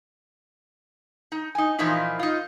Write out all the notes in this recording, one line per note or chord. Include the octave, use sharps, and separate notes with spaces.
D#4
D#4 G#5
A#2 E3 F3 A#3 D#4 E4
D#4 F4